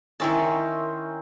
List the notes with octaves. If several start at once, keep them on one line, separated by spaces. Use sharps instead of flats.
D#3 C4 C#4 D#4 E4 A#4 E5 A5